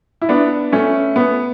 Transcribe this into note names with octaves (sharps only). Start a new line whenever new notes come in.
E4
B3 D4
A3 C#4
B3